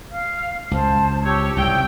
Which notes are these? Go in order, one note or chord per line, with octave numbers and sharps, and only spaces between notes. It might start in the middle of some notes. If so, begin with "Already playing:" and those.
F5 F6
C#2 C5 A5
G4 C#5 E6
C2 G#2 G5